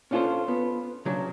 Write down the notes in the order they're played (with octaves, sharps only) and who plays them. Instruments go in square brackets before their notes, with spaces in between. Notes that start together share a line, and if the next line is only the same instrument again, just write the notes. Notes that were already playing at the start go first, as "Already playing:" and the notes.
[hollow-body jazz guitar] C#4 D4 F4 F#4 A4 C5
B3
C#3 F#3 D4